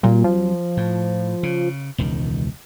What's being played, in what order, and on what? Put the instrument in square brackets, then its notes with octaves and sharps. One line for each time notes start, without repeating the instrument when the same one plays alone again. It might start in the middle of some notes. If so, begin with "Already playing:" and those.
[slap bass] D2 F#3 C4 [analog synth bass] A#2
[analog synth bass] F3
[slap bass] A2
C#3
E1 C#2 D#3